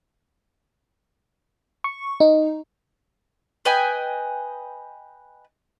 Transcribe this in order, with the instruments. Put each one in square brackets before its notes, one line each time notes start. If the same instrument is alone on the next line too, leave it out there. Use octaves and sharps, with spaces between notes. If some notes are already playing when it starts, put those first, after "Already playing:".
[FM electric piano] C#6
D#4
[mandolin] B4 D#5 G5 G#5